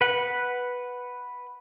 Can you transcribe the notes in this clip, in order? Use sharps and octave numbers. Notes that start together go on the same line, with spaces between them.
B4 F#5